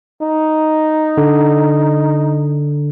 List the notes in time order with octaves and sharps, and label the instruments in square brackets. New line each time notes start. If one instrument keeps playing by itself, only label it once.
[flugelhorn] D#4
[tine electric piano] D3